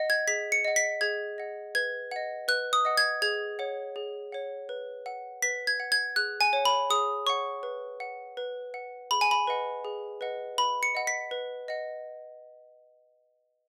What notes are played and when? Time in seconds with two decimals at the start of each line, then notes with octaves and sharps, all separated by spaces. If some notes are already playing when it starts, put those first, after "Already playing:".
Already playing: D#5 F#5
0.10 G#6
0.28 G#4 B6
0.52 C#7
0.65 D#5 F#5
0.76 B6
1.01 G#4 G#6
1.38 D#5 F#5
1.75 B4 G#6
2.11 D#5 F#5
2.48 B4 F#6
2.73 D#6
2.85 D#5 F#5
2.97 G#6
3.22 G#4 G#6
3.59 C#5 F#5
3.96 G#4
4.32 C#5 F#5
4.69 B4
5.06 F#5
5.42 B4 B6
5.67 G#6
5.80 F#5
5.92 G#6
6.16 G#4 F#6
6.41 G#5
6.53 C#5 F#5
6.65 B5
6.90 G#4 D#6
7.26 C#5 F#5 C#6
7.63 B4
8.00 F#5
8.37 B4
8.74 F#5
9.11 G#4 B5
9.21 G#5
9.31 B5
9.47 B4 D#5 F#5
9.85 G#4
10.21 B4 D#5 F#5
10.58 B4 B5
10.83 C#7
10.95 D#5 F#5
11.07 B6
11.31 B4
11.68 D#5 F#5